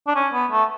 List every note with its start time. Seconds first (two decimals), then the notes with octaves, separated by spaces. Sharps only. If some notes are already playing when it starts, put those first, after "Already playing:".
0.07 D4
0.15 C#4
0.33 B3
0.51 A3